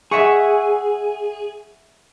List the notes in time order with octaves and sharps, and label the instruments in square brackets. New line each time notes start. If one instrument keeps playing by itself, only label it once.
[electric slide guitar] G#4 [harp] E5 F#5 C#6